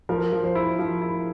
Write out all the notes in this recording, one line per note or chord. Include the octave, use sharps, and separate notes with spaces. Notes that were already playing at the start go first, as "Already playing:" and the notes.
F3 A#4
F3
C5
E4
F3
E4